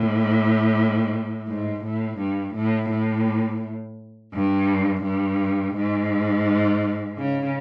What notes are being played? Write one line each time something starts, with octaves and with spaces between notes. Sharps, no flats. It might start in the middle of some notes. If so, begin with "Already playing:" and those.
Already playing: A2
G#2
A2
G2
A2
A2
G2
G2
G#2
C#3